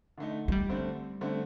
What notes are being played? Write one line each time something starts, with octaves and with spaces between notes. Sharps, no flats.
D3 A3 D#4
A3
G3
D3 A3 C4
D3 A3 C4